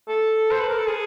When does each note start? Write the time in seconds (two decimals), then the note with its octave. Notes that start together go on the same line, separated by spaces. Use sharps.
0.08 A4
0.51 C5
0.60 B4
0.69 A#4
0.78 A4
0.87 G#4